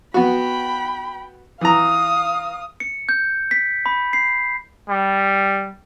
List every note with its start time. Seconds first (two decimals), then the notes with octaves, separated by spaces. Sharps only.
0.14 B3 F#4 G5 B5
1.61 E3 F5 A#5 D#6
2.80 C#7
3.09 G6
3.51 B6
3.86 B5
4.13 C7
4.89 G3